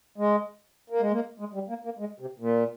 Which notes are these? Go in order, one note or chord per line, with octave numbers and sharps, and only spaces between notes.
G#3
A#3
G#3
A#3
G#3
G3
A#3
A#3
G#3
C3
A#2